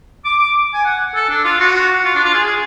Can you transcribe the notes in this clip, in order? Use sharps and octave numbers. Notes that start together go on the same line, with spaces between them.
D6
D6
G#5
F#5
A4
D4
F4
F#4
F4
D4
F4
G#4
G#4